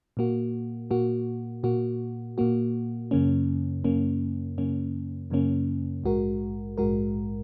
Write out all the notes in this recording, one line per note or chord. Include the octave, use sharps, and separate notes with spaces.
A#2 A#3 F#4
A#2 A#3 F#4
A#2 A#3 F#4
A#2 A#3 F#4
F#2 C#3 A#3 C#4
F#2 C#3 A#3 C#4
F#2 C#3 A#3 C#4
F#2 C#3 A#3 C#4
A#1 G#2 G#3 F#4 A#4
A#1 G#2 G#3 F#4 A#4